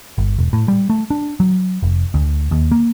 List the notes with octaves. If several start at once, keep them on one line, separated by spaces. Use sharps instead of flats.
G1
E1
A2
G3
A3
D4
F#3
F1
D2
D#2
A#3